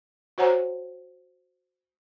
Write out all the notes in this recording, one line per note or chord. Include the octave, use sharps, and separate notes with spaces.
F#4 C5 C#5 F#5 G#5 A#5